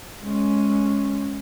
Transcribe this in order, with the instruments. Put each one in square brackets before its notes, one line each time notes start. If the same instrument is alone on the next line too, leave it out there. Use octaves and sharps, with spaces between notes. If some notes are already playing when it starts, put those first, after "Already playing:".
[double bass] G#3 C#4